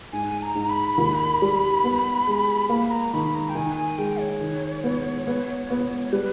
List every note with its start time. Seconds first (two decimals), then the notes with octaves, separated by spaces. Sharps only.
0.13 G#2 G#5
0.42 A#5
0.55 G#2
0.70 B5
0.98 D#2
1.42 G3
1.84 B3
2.27 G#3
2.69 A#3 B5
2.91 A#5
3.12 D#3 B5
3.34 A#5
3.49 G5
3.55 D#3 G#5
3.77 G#5
3.98 G#3 G5
4.20 C#5
4.41 D#3
4.84 B3
5.27 B3
5.70 B3
6.12 G3 B4